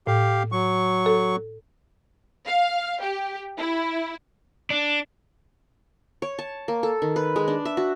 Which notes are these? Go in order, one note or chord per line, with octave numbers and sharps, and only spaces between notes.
A2 G4 F5
F#3 C#6
A4
F5
G4
E4
D4
C#5
A5
A#3
A4
D#3
B4
G#3
D4
E5
F#4